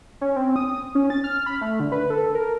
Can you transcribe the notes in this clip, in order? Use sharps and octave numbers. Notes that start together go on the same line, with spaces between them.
C#4
C4
D#6
C#4
A6
F6
B5
A3
D3
B4
A4
A#4